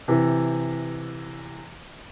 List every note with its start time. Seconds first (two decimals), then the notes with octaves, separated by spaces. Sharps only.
0.08 C3 E3